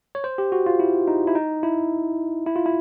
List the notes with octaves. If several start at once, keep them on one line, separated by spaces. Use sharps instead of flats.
C#5
C5
G4
F#4
F4
E4
D#4
E4
D#4
E4
E4
F4
E4